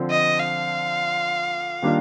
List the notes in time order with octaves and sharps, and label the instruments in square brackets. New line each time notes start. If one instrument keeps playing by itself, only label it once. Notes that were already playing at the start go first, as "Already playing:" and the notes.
Already playing: [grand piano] D3 F3 C4
[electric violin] D#5
F5
[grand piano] D#3 G3 A#3 D4 F4